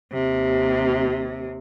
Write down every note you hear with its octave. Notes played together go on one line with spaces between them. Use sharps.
D#2 C3